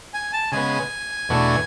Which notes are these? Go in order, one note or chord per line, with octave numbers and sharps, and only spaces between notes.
G#5
A5
C#3 G#3 B3 G#5
E2 B2 A3 D4 F#4